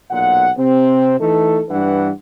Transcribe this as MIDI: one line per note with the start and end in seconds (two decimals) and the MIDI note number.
0.11 0.50 35
0.11 0.50 46
0.11 0.50 78
0.57 1.16 48
0.57 1.16 60
1.20 1.62 52
1.20 1.62 57
1.20 1.62 63
1.20 1.62 69
1.69 2.11 43
1.69 2.11 52
1.69 2.11 62
1.69 2.11 71
1.69 2.11 78